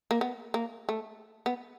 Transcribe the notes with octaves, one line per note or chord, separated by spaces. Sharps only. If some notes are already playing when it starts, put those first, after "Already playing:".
A#3
B3
A#3
A3
B3